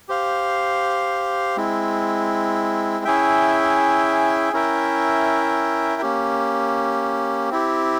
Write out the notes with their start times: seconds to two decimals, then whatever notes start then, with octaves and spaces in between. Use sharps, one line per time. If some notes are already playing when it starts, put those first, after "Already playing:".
0.08 G4 C5 F5
1.57 G#3 C4 E4
3.05 C#4 E4 G#4 E5 G5
4.53 C#4 E4 A#4 E5 G5
6.02 A#3 C#4 G4
7.50 C4 E4 G4